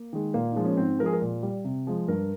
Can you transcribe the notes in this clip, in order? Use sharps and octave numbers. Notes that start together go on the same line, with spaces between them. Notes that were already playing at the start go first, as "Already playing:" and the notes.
Already playing: A#3
D#3 G#3
A#2 A#3
F3 G#3 D#4
C#4
G#2 C4
F3 G#3 A#4
G#4
A#4
A#2
G3
C3
F3 G#3
G2 A#4